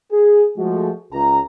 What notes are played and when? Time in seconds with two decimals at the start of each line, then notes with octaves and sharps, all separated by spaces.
0.12 G#4
0.57 F3 G#3 A3 F#4
1.12 C#2 A#5